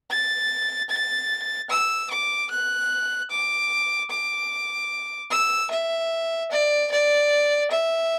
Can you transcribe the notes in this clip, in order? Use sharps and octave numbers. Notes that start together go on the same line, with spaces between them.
A6
A6
E6
D6
F#6
D6
D6
E6
E5
D5
D5
E5